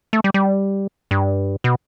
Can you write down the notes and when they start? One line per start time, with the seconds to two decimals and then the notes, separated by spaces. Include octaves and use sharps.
0.13 A3
0.24 G3
0.34 G3
1.11 G2
1.64 B2